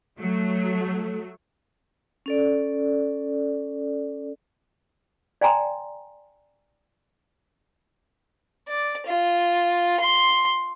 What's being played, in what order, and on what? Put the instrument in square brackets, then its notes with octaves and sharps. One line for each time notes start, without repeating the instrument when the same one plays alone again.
[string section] F#3 A3
[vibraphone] C#4 A4 D5
[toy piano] D5 G5 G#5 A#5 C6
[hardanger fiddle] D5
F4
C6